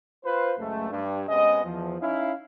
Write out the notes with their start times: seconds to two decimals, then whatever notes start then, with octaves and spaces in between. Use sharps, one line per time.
0.24 F4 B4 C5
0.58 C#2 F#2 A3
0.90 G2
1.28 C3 G#3 B3 C#4 G#4 D#5
1.64 E2 F3
2.00 C#4 D#4 E4 F5